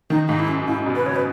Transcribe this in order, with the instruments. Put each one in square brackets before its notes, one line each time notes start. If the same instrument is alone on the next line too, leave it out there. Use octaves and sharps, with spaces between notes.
[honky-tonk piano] D#3 [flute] D#4
[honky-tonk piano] G#2 [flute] D#4
[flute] E4
[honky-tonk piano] F#2
F#2
[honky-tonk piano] G#2 [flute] E4
[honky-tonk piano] B2
[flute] B4
[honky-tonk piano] C#3 [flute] C#5
[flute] B4